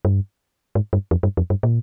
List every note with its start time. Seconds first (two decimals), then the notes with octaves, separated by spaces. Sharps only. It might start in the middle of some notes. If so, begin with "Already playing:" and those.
0.05 G2
0.75 G#2
0.93 G2
1.11 F2
1.23 G2
1.37 F2
1.50 G2
1.63 A#2